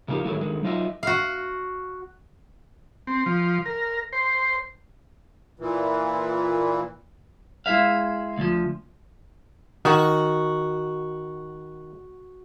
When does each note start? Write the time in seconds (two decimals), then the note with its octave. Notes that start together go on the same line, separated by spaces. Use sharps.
0.08 C#3 F3 A#3 D#4 G4
0.24 A2 D#3 F#3 G#3 A3 E4
0.40 D3 D#3 G#3
0.63 F#3 D#4 F4 B4 D#5 E5
1.03 F#4 F5
3.07 C4
3.26 F3
3.66 A#4
4.13 C5
5.59 A#2 E3
7.66 G#3 E4 G#4 E5 F5
8.38 D2 F3
9.85 D#3 F#4